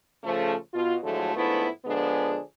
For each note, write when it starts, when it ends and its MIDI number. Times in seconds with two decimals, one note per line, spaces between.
0.23 0.54 49
0.23 0.54 53
0.23 0.54 57
0.73 0.95 47
0.73 0.95 65
1.02 1.32 45
1.02 1.32 50
1.02 1.32 53
1.02 1.32 54
1.02 1.32 56
1.02 1.32 57
1.36 1.66 44
1.36 1.66 53
1.36 1.66 57
1.36 1.66 59
1.36 1.66 62
1.36 1.66 64
1.85 2.39 50
1.85 2.39 53
1.85 2.39 56
1.85 2.39 59
1.85 2.39 62
1.85 2.39 68